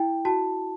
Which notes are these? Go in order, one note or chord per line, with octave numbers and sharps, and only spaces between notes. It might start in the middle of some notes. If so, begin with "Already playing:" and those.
Already playing: E4 G5
F#4 A5